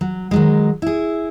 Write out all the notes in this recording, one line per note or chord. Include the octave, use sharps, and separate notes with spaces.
F#3
D#3 F#3 G#3
E4 G#4